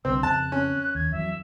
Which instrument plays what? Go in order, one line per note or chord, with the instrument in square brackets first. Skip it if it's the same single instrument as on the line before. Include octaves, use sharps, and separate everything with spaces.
[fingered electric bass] C2 D3 [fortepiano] C4 [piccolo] E6
[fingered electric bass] F2 C#3 [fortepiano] A5 [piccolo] F#6
[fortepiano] C#4
[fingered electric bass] D#2 [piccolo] G#6
[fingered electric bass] F2 E3 F#3 [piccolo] E5